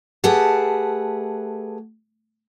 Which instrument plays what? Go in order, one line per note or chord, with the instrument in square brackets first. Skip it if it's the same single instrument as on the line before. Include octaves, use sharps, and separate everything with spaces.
[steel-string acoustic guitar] A3 G4 G#4 B4 F#5 A5